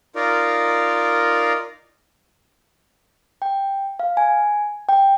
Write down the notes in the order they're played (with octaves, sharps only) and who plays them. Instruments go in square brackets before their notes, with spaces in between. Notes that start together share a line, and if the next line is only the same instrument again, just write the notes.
[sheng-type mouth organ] D#4 F4 A#4 D5
[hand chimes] G5
F5
G#5
G5